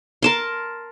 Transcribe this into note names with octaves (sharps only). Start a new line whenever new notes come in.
A#4 A5 C6